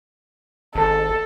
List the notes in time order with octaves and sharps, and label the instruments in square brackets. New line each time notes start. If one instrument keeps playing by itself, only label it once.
[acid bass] G#1 [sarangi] A4 [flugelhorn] A5